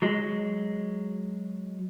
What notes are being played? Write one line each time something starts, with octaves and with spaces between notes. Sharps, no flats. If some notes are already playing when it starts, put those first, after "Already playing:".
F#3 G#3